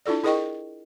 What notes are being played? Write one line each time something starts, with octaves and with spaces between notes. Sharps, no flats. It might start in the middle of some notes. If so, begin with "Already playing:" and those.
D4 E4 F4 A4 D5
E4 G#4 A#4 D#5 G5 C#6